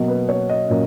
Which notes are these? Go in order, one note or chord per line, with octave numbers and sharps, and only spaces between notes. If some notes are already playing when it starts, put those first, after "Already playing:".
Already playing: B2 F#3 A#3 D#5
B4
C#5
D#5
A#2 F#3 A#3 C#4